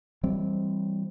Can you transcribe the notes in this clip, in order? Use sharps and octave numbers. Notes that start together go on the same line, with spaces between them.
E3 G3 C4